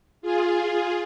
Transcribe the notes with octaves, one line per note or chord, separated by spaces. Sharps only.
F4 G#4